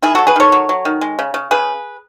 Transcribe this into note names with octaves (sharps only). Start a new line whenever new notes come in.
D#3 E4 G#4
F#3 F#4 A4
G#4 B4
D#3 A4 C#5
F#3
F#3
D#3
G#3
C#3
C#3
C#3 G#4 B4